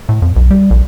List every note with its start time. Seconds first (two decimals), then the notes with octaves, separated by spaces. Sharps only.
0.09 A2
0.22 F2
0.36 B1
0.51 G3
0.70 A#1